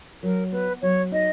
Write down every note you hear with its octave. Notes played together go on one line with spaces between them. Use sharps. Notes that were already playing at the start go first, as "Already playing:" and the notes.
F#3 A#4
B3 B4
F#3 C#5
D#4 D#5